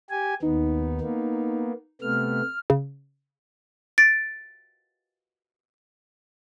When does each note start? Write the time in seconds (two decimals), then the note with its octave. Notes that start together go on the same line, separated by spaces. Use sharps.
0.10 G4 G#5
0.42 D#2 B3 D#4
1.01 A#3 B3
2.02 C3 A3 B3 F6
2.70 C#3
3.98 A6 D7